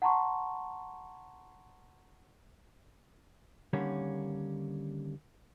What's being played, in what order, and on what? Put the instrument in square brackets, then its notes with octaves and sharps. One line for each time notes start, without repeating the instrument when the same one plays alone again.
[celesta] F#5 A5 A#5 C6 C#6
[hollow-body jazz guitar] D3 D#3 G3 A#3 C#4